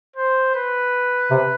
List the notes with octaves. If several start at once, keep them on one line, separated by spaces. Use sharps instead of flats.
C5
B4
C3